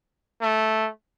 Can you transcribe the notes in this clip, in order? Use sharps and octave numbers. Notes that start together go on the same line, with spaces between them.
A3